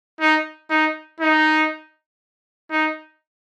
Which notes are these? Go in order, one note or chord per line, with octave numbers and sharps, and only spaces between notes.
D#4
D#4
D#4
D#4